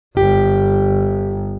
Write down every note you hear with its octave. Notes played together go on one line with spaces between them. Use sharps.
G1 G4